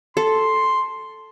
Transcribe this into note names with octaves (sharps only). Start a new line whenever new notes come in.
A4 C6